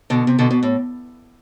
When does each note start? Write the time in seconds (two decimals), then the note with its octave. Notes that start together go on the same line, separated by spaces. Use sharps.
0.10 B2 D3
0.27 C3
0.39 B2 D3
0.51 B2
0.63 A2